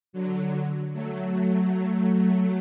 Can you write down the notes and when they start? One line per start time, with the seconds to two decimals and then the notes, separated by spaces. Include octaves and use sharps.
0.13 D3 F#3
0.94 F#3 A3
2.14 F#3 A3